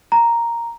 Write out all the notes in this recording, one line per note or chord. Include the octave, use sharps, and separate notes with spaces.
A#5